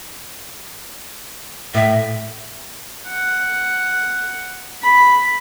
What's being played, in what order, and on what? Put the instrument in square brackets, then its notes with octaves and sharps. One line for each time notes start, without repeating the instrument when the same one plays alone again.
[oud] A2 [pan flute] E5
[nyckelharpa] F#5
B5